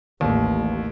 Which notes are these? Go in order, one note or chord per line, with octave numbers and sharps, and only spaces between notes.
A1 D#2